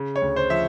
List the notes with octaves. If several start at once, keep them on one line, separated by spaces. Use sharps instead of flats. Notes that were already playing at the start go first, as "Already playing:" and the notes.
Already playing: C#3
C#5
D2
C5
F3 E5